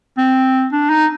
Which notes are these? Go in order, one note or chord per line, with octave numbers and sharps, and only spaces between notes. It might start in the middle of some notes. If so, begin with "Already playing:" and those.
C4
D4
D#4